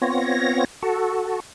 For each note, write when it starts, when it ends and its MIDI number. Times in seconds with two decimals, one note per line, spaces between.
0.02 0.65 59
0.02 0.65 60
0.02 0.65 65
0.02 0.65 73
0.02 0.65 94
0.83 1.40 66
0.83 1.40 69